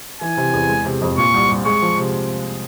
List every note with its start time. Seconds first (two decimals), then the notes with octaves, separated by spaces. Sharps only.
0.21 E3 G#5
0.37 C3
0.53 E2
0.69 G#3
0.85 C3
1.01 F2
1.18 A#2 C#6
1.34 C2
1.49 C2
1.65 G#3 C#6
1.82 F3
1.98 C3